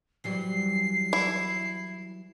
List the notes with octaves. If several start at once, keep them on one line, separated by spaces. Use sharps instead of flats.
E3 F#3 G3 C7
E4